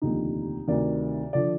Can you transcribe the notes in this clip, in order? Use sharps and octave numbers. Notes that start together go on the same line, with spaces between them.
F1 D#2 D3 F3 D#4
D2 C3 D#3 D5
D3 F3 D5